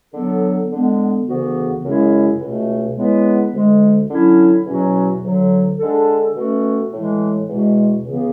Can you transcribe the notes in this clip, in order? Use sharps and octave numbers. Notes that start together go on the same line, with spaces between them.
D3 F#3 B3 D4 A4
D3 G#3 B3
D2 C#3 E3 B3 F#4
F#2 C#3 G#3 C#4 E4
C#2 B2 A3
C#3 G#3 B3 E4 B4
D2 D3 G#3
D3 F#3 C#4 E4
E2 B2 F#3 C#4 F#4
D2 D3 F#3
D3 G#3 D4 A4
B2 A3 C#4 F#4 A4
A2 E3 G#3
E2 B2 G#3
C#2 C#3 E3 B3